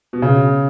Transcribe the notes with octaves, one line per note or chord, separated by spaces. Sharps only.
B2
C#3